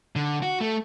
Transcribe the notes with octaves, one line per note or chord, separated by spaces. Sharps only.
D3
F#4
A3